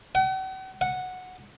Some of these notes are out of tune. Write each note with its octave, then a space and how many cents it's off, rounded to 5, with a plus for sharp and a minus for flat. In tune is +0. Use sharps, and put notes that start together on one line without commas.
F#5 +45
F#5 -5